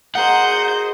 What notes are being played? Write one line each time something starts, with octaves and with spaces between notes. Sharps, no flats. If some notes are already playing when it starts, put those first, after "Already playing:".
F#4 G#4 A#4 C5 D#5 F#5 G6